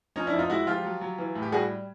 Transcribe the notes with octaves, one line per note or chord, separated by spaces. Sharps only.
F3 C#4 D#4
D4 E4
F2
D#4 F4
G#3 E4 F#4
F3 F4 G4
F#3
F#3
E3
A2
G4
G3 F#4 G#4